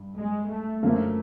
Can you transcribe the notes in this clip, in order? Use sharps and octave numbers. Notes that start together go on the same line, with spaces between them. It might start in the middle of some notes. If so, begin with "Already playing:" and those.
Already playing: G2
G#3
A3
F#2 D3 F3 A3 A#3